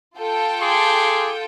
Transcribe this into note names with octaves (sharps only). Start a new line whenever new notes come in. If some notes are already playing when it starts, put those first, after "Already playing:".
F4 A4 G5
G#4 C6 D6